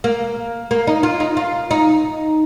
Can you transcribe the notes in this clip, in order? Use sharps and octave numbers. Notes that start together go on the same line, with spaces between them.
A#3
A#3
D#4
F4
D#4
F4
D#4